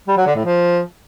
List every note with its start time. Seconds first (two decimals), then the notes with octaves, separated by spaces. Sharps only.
0.08 G3
0.17 F#3
0.26 D3
0.36 A2
0.45 F3